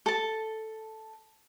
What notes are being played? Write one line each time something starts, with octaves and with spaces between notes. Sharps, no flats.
A4 A5